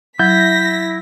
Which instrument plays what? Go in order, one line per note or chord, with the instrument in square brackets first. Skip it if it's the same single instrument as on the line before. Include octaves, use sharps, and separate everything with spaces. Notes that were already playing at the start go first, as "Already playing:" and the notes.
[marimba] F#3 [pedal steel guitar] E4 [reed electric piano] G6 [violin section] A#6 B6